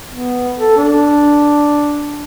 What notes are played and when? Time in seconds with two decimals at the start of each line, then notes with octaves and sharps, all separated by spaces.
0.09 B3
0.57 A4
0.77 D4